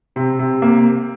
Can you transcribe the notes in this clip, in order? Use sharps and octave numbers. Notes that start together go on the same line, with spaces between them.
C3
C3
A#3